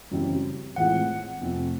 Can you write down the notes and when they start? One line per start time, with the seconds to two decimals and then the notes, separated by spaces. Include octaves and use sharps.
0.11 F#2 C#3 E3 G3 C4
0.76 A2 E3 G#3 C4 F4 F#5
1.41 F2 C3 F3 A3 C4